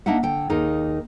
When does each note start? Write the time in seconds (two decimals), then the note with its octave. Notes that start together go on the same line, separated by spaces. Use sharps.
0.06 A#3 D4 D#4 E5 F#5
0.23 D3 G5
0.50 D#2 A#3 D#4 G#4 A#4